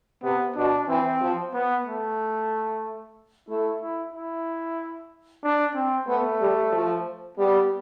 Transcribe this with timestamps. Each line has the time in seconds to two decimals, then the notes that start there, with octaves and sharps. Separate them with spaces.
0.23 C3 B3
0.56 B2 D4
0.88 E3 C4
1.21 F3
1.54 B3
1.86 A3
3.48 A3 E4
3.81 E4
4.13 E4
5.43 D4
5.75 C4
6.07 A3 B3
6.41 G3
6.72 F3
7.38 G3 B3